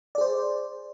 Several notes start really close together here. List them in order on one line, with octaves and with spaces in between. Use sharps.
D5 G#4 C5